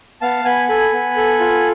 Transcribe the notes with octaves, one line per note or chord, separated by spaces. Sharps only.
B3 F5 A5
B3 G#5 B5
A4 G#5 B5
B3
A4
F4